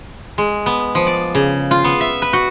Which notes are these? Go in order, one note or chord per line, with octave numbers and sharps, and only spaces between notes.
G#3
B3
F3
D5
C#3
F4
B3
E5
B4
F#4